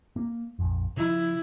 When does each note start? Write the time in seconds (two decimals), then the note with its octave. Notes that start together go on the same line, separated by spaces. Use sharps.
0.16 A#3
0.59 A#1 F2
0.97 C#3 F3 E4